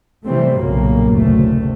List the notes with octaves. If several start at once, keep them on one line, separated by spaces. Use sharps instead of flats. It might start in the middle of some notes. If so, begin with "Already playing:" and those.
C3 E3 G3 A3 C4
B1 G2 A#2 C#3 F#3 A#3
F#1 D2 C3 A3